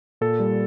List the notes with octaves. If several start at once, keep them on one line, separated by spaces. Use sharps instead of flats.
A#2 A4
G3